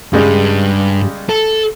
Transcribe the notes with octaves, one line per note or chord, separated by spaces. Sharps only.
G2 C#3 G3 G#3
A4